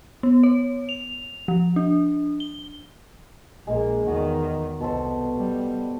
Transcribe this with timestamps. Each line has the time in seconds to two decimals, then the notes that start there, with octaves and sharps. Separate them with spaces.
0.23 B3
0.43 C#5
0.89 F7
1.48 F3
1.76 D4
2.40 G7
3.67 A#1 G#3 A#3
4.07 E2 D#3 F#4
4.80 C2 B2 A4 C5
5.38 G3